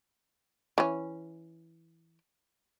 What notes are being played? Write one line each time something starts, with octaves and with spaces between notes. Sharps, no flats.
E3 C#4